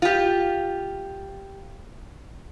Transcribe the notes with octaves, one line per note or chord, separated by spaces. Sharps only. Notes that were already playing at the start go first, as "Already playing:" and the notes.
F4 G4